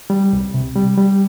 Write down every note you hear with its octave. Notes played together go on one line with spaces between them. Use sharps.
G3
C2
C3
G3
G3